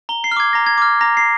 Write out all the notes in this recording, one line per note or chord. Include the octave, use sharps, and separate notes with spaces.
A#5 G7
C7
F6
D6 G#6
A#5 A#6
G#6
D6 F6
A#5 A#6
C7